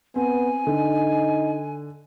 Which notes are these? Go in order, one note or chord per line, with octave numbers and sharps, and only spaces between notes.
B3 C4 G#5
D3 D#4